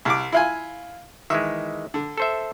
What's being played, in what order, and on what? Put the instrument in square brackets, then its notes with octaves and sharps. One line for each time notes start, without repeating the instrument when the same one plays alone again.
[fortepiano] C2 D6
E4 F4 G#5
[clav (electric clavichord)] D#3 E3 G#3 [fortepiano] E5
[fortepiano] D3
[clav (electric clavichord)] A4 C5 E5